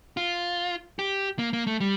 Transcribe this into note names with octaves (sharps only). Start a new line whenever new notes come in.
F4
G4
A#3
A#3
A3
G3